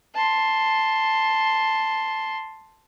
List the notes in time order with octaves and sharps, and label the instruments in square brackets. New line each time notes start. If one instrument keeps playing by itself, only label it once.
[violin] A5 C6